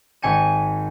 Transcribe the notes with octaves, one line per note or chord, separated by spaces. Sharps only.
G#1 G#5 C#7 D#7